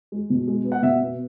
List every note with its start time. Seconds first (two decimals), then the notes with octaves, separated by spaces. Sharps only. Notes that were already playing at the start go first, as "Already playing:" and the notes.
0.12 G#3
0.30 B2
0.48 G#3
0.65 B3
0.72 F#5
0.82 B2 E5
1.01 B3